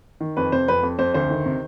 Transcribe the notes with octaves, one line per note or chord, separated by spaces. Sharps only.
D#3
F2 B4
C3 C5
F2 B4
F2
F2 C5
D2 C5
D#3
C3